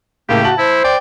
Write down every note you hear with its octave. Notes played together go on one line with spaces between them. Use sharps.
A2 C#3 A#3 G4
F#4 A5 F#7
E4 C5
D5 G5